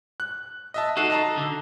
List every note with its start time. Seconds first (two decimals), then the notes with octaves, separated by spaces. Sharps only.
0.20 F#6
0.74 D#5 E5 A5
0.97 D#4 F#4 A4 F#6 C7
1.10 D#5 A5 A#5
1.37 D3